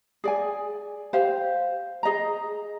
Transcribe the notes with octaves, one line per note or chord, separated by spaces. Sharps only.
G#4 D5 G#5
G4 C5 F5
G#4 D#5 A#5